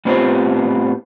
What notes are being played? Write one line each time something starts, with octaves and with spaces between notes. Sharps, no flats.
A2 B3 C4 F4 G4 C5